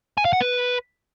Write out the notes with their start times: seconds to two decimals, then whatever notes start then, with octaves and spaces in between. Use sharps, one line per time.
0.18 G#5
0.25 F5
0.33 F#5
0.41 B4